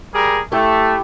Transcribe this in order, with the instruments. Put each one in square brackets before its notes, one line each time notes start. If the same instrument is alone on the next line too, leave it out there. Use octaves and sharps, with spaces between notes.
[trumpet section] G3 G#4 A#4
[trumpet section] A3 [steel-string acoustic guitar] E4 G4